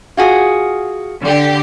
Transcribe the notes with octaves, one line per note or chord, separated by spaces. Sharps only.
F4 F#4 G#4
D3 G4